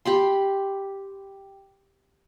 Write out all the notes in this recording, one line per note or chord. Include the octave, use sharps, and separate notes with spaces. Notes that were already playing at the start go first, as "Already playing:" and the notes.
G4 B5 C6